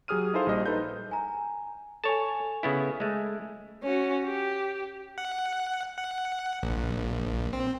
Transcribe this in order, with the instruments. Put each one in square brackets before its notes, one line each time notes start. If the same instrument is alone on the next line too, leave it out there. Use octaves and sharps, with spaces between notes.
[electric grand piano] F#3 G4 G#4 D#6 F6 D#7
D#4 E4 G#4 A4 C5 F5
A#1 G3 D#5
D#4 A4 B4 C5 G6
[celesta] G#5 A#5
[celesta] A4 G#5 [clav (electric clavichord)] C#5 A5
[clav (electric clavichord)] C#3 B3 E4
G#3 A3
[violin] C#4 F#4
G4
[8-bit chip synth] F#5
F#5
A#1
C4